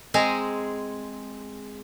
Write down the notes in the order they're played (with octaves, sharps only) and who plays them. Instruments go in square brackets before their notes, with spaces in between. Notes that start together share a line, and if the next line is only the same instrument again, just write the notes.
[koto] G#3 C4 G#4 A#5